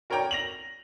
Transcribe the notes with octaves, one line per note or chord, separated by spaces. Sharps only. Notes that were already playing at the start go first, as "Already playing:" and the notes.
F#4 A#4 C#5 D5 G5 A#5
A#6 F7 F#7